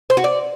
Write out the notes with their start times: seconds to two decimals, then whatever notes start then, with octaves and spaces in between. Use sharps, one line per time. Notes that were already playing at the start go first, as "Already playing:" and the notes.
0.10 C5
0.17 F#4
0.24 D5